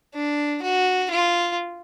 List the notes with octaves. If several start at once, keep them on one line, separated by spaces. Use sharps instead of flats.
D4
F#4
F4